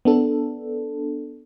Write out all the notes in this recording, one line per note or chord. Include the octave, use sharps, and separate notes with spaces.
B3 D4 A4